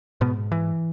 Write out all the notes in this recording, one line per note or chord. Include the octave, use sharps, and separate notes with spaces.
G#2 B2 B3
E3